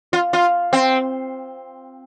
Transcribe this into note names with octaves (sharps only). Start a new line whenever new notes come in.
F4
F4
C4